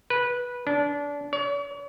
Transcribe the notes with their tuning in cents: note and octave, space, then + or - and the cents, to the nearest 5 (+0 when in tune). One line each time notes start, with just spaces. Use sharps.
B4 -15
D4 -25
C#5 +40